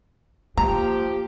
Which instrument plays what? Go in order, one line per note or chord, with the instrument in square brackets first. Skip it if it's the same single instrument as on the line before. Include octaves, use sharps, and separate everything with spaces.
[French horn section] F3 G4 [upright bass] A#3 [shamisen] A#5